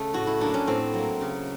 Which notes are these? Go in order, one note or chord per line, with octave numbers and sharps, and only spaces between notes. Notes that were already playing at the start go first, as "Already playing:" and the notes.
Already playing: C#3 A3
A2 F#4
E4
F#3 A#3 D4
C#4
A2 C4
F#3 A#3
C#3